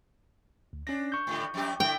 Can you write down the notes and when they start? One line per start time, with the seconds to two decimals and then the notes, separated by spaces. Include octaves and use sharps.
0.73 D2
0.87 C#4 D4 A#6
1.12 C#6 G6
1.27 G#2 D3 G3
1.54 F2 G3 G4
1.80 D3 G3 E4 G5